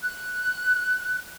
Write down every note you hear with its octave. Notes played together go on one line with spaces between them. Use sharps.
F#6